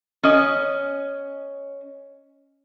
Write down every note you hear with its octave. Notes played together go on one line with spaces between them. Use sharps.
C#4 D#5